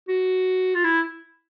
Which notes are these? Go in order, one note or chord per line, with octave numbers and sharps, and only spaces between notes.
F#4
F4
E4